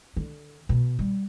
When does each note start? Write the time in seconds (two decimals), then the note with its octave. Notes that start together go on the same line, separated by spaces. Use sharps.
0.17 D3
0.69 B2
0.99 G3